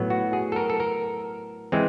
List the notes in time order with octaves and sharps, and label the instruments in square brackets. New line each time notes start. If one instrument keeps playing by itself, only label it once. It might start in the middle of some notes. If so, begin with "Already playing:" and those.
Already playing: [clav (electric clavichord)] A2 F#3 B3
F#4
G#4
A4
A#4
A4
A#4
E3 G#3 C4